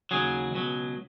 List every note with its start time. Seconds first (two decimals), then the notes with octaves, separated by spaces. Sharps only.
0.11 D#2 C#3 F#3 G#4
0.53 C#2 B2 F#3